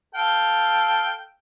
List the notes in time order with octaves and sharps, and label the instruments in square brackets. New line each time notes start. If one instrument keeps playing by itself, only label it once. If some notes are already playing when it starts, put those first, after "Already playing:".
[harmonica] A4 F5 G5